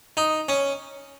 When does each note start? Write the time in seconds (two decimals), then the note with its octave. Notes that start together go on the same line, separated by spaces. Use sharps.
0.17 D#4
0.49 C#4